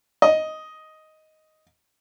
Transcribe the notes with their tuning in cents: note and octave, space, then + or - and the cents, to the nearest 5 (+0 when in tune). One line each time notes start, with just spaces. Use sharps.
D#5 +5